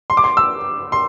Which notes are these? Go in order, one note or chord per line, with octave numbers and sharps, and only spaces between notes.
C6
D6
C6
E6
C6